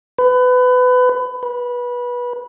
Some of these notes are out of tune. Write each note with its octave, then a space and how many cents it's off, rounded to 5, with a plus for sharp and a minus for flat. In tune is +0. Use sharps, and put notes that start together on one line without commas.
B4 +25
B4 -20